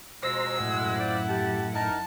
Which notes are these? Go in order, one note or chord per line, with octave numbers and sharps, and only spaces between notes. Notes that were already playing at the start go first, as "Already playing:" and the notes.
F2 B2 G#3 C5 A#5 E6
F#2 A2 E4 F#5
F4 C5 D5
G4 A5
D#4 A#4 A5